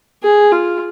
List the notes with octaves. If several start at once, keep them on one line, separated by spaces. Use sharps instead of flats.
G#4
F4